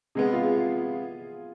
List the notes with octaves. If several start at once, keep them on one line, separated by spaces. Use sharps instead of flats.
C3 G#3 B3 G#4
F4
G#4
F4